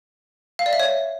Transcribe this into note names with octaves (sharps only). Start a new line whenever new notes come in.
F5
D5
E5
C#5